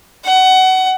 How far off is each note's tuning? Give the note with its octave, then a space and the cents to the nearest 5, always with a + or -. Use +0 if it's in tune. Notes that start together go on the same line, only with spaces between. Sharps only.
F#5 +25